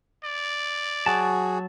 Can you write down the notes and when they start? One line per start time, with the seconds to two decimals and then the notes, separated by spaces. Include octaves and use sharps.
0.23 D5
1.06 F#3 F#4 G#4 A5